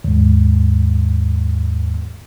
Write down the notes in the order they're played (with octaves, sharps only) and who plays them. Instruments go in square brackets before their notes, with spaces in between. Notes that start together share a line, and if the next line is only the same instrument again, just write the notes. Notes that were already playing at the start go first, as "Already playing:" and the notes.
[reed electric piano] D#2 G#2